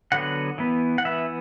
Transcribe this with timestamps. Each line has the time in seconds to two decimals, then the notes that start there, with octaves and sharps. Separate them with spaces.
0.12 D3 F#3 B3 F#5
0.58 E3 B3
0.98 F#5
1.05 E3 B3 E5